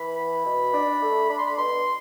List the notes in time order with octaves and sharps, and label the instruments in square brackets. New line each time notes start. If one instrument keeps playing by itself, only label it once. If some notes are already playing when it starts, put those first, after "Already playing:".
Already playing: [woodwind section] E3 B5
B3
B2
D4
A3
D4 B5
C6
B5
B2 C6